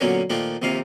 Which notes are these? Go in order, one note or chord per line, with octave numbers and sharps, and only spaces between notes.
A#2 D3 F#3 B3 C#4
A#2 D#3 F3 A3 D4
A#1 D#2 C3 D#3 F4 F5